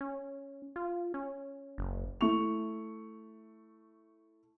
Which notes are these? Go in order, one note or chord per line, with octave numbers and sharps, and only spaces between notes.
C#4
F4
C#4
F#1
A3 E4 C#6 F7